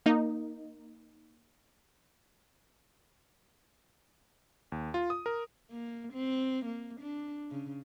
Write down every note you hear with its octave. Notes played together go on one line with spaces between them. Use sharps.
A#3 D#4
D#2
F4
D#6
A#4
A#3
C4
A#3
D4
C#3